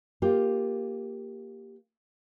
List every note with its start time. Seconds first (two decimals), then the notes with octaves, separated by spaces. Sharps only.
0.22 A#3 F4 G4